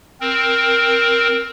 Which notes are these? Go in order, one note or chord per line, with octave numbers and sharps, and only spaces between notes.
C4 A#4